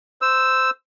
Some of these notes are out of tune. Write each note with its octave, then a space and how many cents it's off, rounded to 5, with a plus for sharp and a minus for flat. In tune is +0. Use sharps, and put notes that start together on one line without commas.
C5 -10 E6 +0